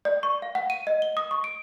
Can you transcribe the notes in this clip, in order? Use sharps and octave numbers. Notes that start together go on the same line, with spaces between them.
D5
C#6
F5
F#5
D#7
D#5
G7
D#6
C#6
D7